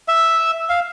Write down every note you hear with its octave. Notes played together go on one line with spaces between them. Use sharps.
E5
F5